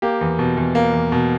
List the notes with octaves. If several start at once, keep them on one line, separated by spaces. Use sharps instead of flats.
A#3 G4
E2
B2
E2
A#3
E2
B2